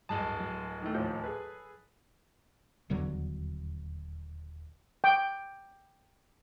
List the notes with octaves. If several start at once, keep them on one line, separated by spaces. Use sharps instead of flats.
D1 G2 F#3 G#3 A5 D#6
F#3
D#3 E3 A3
D#2 A2 F3 G6
G#4 A4 B4
D#1 E2 D3 F#3
G5